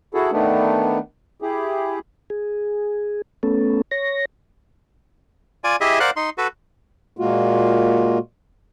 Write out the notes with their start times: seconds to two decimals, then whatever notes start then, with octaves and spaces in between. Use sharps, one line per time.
0.14 E4 F#4 G#4 A4
0.32 D#3 A3 B3 D4
1.42 E4 G4 G#4
2.30 G#4
3.43 A3 B3 C#4 A4
3.91 C#5 A#6
5.64 F4 D5 G#5
5.81 E4 G4 G#4 D#5 E5
6.00 A#4 C5 D5 F5 F#5 F#6
6.16 D#4 C6
6.38 F#4 A4 B4
7.17 A#2 G#3 A#3 F4 F#4